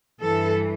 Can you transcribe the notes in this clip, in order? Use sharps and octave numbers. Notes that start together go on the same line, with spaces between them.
G2 E3 A4